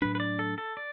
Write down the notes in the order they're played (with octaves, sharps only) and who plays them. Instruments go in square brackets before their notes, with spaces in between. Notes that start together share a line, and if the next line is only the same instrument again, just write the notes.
[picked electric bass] A2 F#3 D4 [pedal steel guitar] B4
[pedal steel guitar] B4
D5
A4
A4
D5